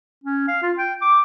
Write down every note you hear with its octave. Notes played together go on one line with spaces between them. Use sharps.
C#4
F5
F4
G5
D6